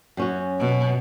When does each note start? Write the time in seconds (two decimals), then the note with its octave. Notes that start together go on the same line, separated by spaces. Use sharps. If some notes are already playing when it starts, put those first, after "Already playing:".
0.17 F#2 C#4 F#4
0.59 B2